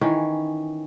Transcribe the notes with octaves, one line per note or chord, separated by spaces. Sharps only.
D#3 E3 C#4